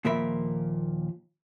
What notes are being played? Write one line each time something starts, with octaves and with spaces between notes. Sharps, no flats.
D#2 A#2 F3 A#4 E5 B5